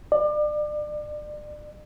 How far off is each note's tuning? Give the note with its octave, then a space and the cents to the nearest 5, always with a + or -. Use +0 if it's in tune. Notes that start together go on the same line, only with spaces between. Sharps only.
D5 +30